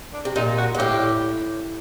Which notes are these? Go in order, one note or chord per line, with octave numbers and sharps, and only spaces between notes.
D4
C3
A#2 D#4
F#4
G2
A2 G4